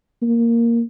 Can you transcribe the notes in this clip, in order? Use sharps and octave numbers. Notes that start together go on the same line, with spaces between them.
A#3